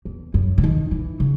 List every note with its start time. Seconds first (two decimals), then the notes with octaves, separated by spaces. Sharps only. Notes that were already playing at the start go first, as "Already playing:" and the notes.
0.05 E2
0.34 F#2
0.58 C#3
0.64 D#3
0.91 E3
1.20 C#3